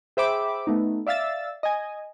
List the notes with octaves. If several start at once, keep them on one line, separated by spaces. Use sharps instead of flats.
G#4 C5 E5 G5 B5 D6
A3 B3 D#4
D5 E5 F5 E6 A6
D#5 G#5